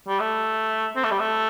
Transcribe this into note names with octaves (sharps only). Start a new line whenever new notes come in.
G3
A3
C4
A3
G3
A3